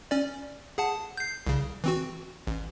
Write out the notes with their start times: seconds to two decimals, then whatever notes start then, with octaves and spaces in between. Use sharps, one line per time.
0.11 C#4 D5
0.78 G#4 F#5 A5
1.17 G6 C7
1.47 C2 C#3
1.84 E3 C4 F#4
2.47 A1